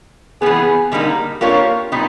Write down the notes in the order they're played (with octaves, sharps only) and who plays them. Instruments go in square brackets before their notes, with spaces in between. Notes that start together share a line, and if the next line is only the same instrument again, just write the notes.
[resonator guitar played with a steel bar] E3 G3 B3 [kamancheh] G#4
[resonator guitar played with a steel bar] D3 G3 A#3 D#4
[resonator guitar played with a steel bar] A#3 D4 G4 A#4 C#5 [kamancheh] F4
[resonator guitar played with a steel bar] A#2 G3 B3 D#4